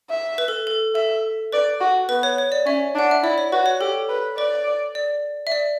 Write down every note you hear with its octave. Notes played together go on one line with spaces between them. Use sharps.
E5
B4
A4
A4
A4 E5
B4 D5
F#4
B3 B4
C#5
C#5
D5
C#4 E5
D4 F#5
E5
E4 D5
C#5
F#4 B4
C#5
G4 A4
B4
B4 D5
D5
E5
D5